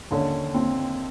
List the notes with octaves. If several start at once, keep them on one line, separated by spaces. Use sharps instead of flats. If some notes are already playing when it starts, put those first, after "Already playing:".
D#2 D3 C#4
C4